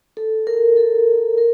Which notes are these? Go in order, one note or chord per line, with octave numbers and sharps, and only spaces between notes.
A4
A#4
A4
A#4